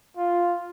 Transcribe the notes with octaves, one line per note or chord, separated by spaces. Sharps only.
F4